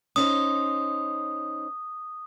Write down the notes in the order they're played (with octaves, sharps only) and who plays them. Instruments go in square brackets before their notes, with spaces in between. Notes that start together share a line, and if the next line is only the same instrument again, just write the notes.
[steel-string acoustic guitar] C#4 D#4 C5 [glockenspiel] D#6